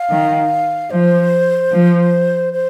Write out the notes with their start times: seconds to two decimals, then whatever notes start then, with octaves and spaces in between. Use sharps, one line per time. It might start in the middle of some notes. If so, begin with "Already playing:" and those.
Already playing: F5
0.10 D#3
0.91 F3 C5
1.72 F3
2.53 C5